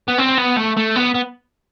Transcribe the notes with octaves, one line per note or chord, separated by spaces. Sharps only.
B3
C4
B3
A3
A3
B3
B3